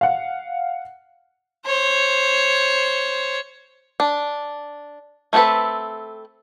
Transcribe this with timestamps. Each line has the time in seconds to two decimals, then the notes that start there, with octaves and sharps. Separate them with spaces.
0.01 F5 F#5
1.66 C5 C#5
4.00 D4
5.33 A3 C4 F#4 A4 B4